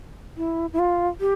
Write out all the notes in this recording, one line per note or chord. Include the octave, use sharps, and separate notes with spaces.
E4
E4
F4
G4